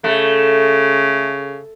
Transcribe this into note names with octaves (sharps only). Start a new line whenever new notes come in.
C#3 A3